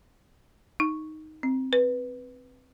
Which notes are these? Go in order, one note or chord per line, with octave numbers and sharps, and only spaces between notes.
D#4
C4
B4